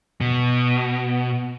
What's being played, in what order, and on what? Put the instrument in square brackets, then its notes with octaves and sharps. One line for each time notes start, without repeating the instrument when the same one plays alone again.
[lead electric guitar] B2